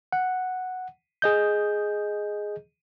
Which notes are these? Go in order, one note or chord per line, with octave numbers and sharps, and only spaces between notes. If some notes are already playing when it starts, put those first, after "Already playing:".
F#5
G#4 D#5 G6